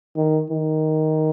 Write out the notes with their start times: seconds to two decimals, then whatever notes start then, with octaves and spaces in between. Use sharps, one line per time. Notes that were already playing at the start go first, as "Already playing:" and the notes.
0.17 D#3
0.50 D#3